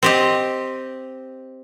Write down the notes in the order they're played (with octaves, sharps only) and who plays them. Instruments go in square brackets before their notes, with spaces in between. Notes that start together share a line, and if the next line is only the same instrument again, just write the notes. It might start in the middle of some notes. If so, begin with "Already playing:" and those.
[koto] C4 G4 D#5